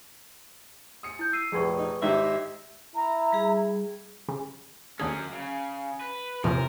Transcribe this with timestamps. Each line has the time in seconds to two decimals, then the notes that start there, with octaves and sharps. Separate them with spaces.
1.03 D#6 C#7
1.19 E4 G6
1.33 E6 C7 D#7
1.52 F1 A#1 G#4 B4 C#6
1.79 D#4
2.02 G#1 D#4 G4 E5
2.96 E4 A#5
3.33 G3 G#4
4.29 C#3
5.00 D#2 D3 F#3 C#4 G#4
5.33 C#3
6.01 B4
6.44 E2 C3 F3 C#4 A#4